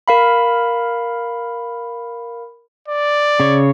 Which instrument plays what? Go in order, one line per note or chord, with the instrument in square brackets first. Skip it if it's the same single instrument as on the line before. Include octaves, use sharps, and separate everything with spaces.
[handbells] A#4 F5 B5
[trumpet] D5
[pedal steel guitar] C#3 C#5